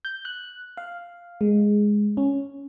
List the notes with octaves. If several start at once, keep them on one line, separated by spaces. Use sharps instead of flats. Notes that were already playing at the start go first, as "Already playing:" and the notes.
G6
F#6
F5
G#3
C#4